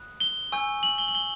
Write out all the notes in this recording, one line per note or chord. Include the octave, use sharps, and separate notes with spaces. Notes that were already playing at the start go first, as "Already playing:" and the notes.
Already playing: B5 D#6 F#6
G7
G#5 C#6 E6 G6
F#7
G7
F#7
G7